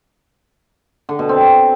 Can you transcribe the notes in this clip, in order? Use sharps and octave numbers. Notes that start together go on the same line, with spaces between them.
D3
B2
C4